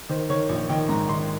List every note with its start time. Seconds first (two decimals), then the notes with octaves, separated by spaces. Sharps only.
0.09 D#3 C5
0.30 D#3 C#5
0.49 A#1
0.69 D#3 G5
0.89 G#2 A#5
1.09 D#3 C6